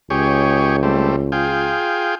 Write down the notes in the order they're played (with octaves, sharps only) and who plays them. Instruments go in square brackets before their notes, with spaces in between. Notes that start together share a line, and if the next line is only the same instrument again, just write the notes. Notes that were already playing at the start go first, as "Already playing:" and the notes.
[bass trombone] C#2 [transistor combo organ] G4 G#4 C#5
[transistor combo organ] G3 A3 C4
F4 G#4 G5